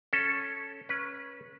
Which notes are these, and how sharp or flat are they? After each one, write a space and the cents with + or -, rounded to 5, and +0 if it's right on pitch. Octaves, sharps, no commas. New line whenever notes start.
C#4 +0 A4 +0
C#4 +0 B4 -30